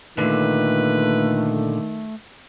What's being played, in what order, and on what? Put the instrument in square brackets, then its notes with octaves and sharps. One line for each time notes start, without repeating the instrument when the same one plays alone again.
[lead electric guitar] A#2 D3 [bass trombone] D#3 [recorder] A3 [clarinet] B4